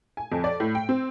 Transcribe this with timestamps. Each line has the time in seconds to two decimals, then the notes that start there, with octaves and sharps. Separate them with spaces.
0.17 G#5
0.32 F2
0.44 D5
0.60 A2
0.75 G5
0.89 C4